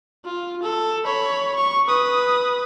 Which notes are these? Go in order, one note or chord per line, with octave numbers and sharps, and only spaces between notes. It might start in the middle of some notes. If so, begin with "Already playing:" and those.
F4
A4
C#5 B5
C#6
B4 D#6